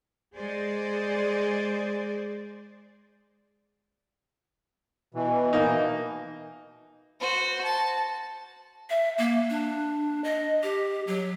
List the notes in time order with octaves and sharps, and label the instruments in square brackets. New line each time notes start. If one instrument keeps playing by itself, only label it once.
[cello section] G#3 G#4 C5 D5
[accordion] B2 E3
[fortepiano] A#3 D#4
[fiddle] F#4 C5
A5
[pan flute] E5
A#3
D4
D#5
G4
F#3